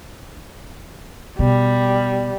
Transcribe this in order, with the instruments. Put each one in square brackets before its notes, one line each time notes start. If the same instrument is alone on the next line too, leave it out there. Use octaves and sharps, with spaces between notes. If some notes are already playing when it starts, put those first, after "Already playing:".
[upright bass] B2 [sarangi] G3